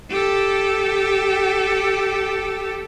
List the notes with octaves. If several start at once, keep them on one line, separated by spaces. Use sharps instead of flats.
G4 A4